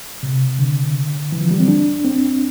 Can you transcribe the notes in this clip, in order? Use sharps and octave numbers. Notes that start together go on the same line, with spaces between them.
C3
D3
E3
F3
G3
C4
D4
C4